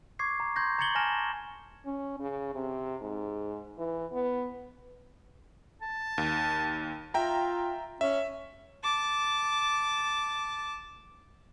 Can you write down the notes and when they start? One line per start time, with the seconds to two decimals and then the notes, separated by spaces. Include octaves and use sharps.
0.19 C#6 D6 G#6 C7
0.40 A#5 G#6
0.56 C6 C#6 G6 G#6 A#6
0.79 A#5 G#6 A6 C#7 F#7 G7
0.95 G#5 A5 F6 A#6 E7
1.86 C#4
2.20 C#3
2.55 C3
3.01 G#2
3.78 E3
4.12 B3
5.82 A5
6.18 D#2
7.14 F4 E5 G5 A#5
8.01 C#4 E5
8.83 A5 D6